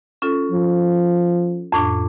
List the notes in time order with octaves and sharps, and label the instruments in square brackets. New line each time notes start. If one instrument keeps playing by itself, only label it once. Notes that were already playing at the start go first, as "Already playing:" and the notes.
[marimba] C#4 F4 A4
[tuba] F3
[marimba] F2 A2 D4